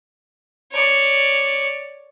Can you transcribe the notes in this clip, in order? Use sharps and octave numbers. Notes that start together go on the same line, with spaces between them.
C#5 D5